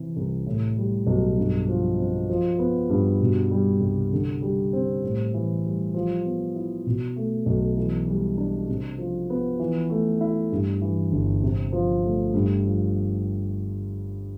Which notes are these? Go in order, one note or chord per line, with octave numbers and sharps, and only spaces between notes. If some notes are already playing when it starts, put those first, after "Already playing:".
Already playing: C3 E3
C2
A2
G3
B1
G2
F3
C4
F3
B3
G2
B2
G3
C2
D3
G3
C4
A2
E3
G3
F3
B3
E4
B2
A3
B1
E3
G3
D4
C3
F3
B3
E3
A3
E4
G2
E3
G1
C3
F3
A3
G2
F3